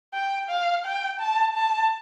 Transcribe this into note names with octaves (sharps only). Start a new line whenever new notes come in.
G5
F5
G5
A5
A5